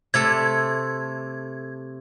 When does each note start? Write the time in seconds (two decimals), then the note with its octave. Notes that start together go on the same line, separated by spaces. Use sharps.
0.14 C3 A3 A4 G#6